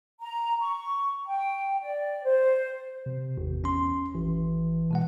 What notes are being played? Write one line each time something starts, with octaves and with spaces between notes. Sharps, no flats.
A#5
C#6
G5
D5
C5
C3
G#1 E2
C#4 C6
G#1 E3
B2 G#3 F#5